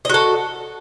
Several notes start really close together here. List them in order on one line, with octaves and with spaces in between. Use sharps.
D#5 F#4 A4